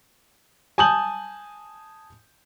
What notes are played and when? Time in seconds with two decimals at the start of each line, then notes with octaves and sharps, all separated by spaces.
0.78 G#5 A5 D#6 G6 F#7